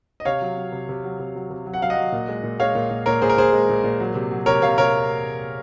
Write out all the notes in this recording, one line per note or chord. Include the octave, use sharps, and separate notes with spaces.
D#5
C3 C#5 F5
F#3
F#3
C3
C3
F#3
C3
F#3
C3
F#3
F#5
F#3 F5
D#5 F#5
F#3
A#2
G#3
A#2
G#3 C#5 F5
A#2
A#2
A#2 A#4 C#5
A#2 G#4 C5
A#4
A#2 G#4 C5
G#3
A#2
A#2
F#3
C3
F#3
C3 A#4 C#5
C3 C#5 F5
C3 A#4 C#5